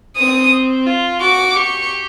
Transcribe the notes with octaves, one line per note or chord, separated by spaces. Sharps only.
C4 D#6
F4
F#4 D6
G4 C#6